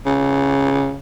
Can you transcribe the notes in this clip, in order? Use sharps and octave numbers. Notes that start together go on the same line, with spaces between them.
C#3